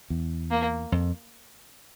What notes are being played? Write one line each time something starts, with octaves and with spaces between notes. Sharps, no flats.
E2
A#3
F2